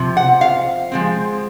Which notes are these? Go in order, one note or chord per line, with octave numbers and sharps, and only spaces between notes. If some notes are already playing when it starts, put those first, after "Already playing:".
Already playing: C3 F3
F#5
F5
F3 G#3 C4